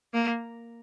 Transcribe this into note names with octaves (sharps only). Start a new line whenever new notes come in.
A#3